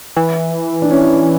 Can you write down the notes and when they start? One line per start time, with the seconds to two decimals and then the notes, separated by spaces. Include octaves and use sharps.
0.17 E3
0.82 D4
0.91 C#4